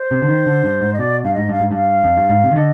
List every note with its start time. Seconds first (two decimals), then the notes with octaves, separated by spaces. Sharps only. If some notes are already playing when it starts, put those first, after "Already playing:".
Already playing: C5
0.11 C3
0.22 D3
0.29 D#3
0.46 D3
0.64 G2
0.81 G#2
0.93 D#5
0.99 B2 D5
1.24 G2 F5
1.34 G#2 D#5
1.49 G2 F5
1.60 G#2
1.71 G2 F5
2.04 F2
2.17 G2
2.29 G#2
2.43 C3
2.51 D#3
2.56 D3 D#5